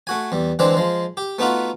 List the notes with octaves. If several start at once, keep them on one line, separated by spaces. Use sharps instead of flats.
A3 F#4 G#5
E2 G3
D3 E3 G#3 C4 D5 A5
F3 G#3
G4
A3 B3 D#4 F4 F#4